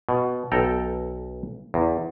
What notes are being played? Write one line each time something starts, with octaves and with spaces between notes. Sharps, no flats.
B2
B1 A4 G5 A#5
E2